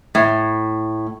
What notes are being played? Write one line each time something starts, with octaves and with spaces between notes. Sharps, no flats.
A2